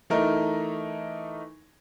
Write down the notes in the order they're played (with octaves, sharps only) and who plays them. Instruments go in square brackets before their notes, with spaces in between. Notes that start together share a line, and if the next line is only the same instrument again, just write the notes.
[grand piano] E3 A3 D#4 A#4